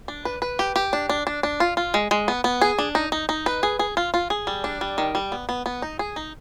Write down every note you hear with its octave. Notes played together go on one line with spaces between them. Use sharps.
D4
B4
B4
G4
G4
D4
D4
D4
D4
F4
F4
G#3
G#3
B3
B3
G#4
D4
D#4
D#4
D#4
B4
G#4
G#4
F4
F4
G#4
G3
D4
G3
D#3
G3
B3
B3
B3
D#4
G#4
D#4